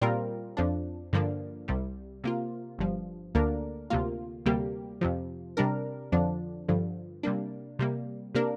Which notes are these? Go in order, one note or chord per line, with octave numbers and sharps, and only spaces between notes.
A#2 G3 C4 F4 A#4
F2 F3 D4
G2 D3 F3 A#3 D4
C2 C3 G3
C3 A#3 F4
G1 G2 F3
D2 D3 A#3 D4 A#4
D2 C3 A#3 F4
D2 C3 G3 A#3 G4
F2 C3 F3
C3 G3 D4 A#4
F2 D3 F3 D4
G2 D3 F3
C3 G3 A#3 D4
C3 G3 A#3
C3 A#3 D4 A#4